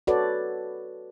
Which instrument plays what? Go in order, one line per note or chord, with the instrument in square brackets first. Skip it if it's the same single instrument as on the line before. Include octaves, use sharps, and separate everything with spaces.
[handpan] F#4 A4 B4 C#5 D5